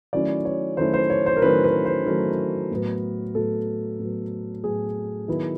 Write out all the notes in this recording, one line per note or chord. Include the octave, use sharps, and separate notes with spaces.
D#3 F#3 A3 C#4 E4 D5
C#5
D#3 F#3 A3 C#4 E4 C5
C5
C#5
C5
A#4
D#3 F#3 A3 C#4 E4 B4
B4
C5
D#3 F#3 A3 C#4 E4 A#4
A2 F#3 B3
A2 F#3 B3 A4
A2 F#3 B3
A2 F#3 B3 G#4
D#3 F#3 B3 E4